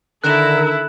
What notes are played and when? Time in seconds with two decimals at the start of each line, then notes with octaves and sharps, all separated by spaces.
0.24 D3 D#3 E4 A4 A#4 F#6 E7